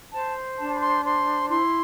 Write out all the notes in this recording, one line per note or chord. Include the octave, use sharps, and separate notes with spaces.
C5 A5
D4 A5
B5
C6
C5 C6
E4 C6